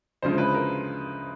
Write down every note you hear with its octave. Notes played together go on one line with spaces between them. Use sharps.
D2 C#3 F3 G#3 C5
B4
A#4